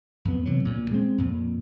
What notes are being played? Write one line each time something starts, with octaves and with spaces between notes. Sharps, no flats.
F2 B3
C3 E3 F#3
D2 A#2
G#3 C4
F2 A#2